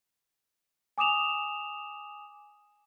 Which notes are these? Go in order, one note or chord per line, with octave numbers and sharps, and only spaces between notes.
G#5 D6 D#6 E7 F7